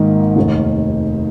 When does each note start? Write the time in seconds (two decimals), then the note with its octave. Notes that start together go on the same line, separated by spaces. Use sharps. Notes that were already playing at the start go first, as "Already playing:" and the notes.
Already playing: G#1 G#2 D#3 A#3
0.36 F1 D#2 D#3